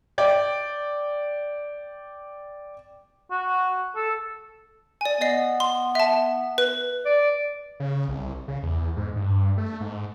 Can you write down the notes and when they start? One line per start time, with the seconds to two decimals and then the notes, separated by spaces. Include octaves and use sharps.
0.18 D5 G5
3.31 F#4
3.96 A4
5.01 D5 G#5
5.21 B3 D5 D#5 C7
5.60 C6
5.95 E5 A5
6.58 B4
7.05 D5
7.80 C#3
8.08 C2
8.48 C#3
8.63 E2
8.97 G#2
9.16 G2
9.58 A3
9.81 G#2